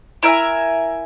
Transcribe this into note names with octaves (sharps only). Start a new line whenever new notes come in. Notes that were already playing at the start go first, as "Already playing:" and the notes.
E4 A#4 E5 G#5